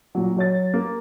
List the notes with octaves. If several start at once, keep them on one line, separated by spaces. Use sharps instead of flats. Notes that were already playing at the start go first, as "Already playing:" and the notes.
A#2 F#3
F#3 C#5 A6
A#3